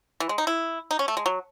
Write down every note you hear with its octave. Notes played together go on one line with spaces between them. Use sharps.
E3
G#3
D#4
E4
D#4
C#4
A3
G#3
F#3